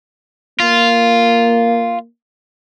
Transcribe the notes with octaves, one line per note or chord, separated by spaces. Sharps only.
A#3 F4